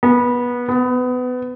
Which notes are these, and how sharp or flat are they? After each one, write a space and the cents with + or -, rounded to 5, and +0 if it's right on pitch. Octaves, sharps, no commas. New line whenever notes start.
B3 -20
B3 +25